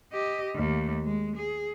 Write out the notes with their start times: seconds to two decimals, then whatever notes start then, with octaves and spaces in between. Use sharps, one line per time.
0.12 G4 D#5
0.56 D#2 A3
1.05 G#3
1.36 G#4